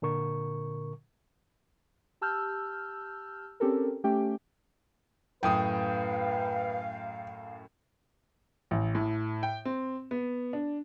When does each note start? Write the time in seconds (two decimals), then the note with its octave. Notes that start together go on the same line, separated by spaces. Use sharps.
0.02 A#2 D3 A#4 C#6
2.21 G4 A5 E6 F6 G6
3.60 C4 C#4 G4 A4 A#4
4.04 A3 C#4 G4 G5
5.43 F#2 A2 B4 F5 G5 D#6
8.71 A1
8.95 A2
9.43 G5
9.65 C4
10.11 B3
10.53 D4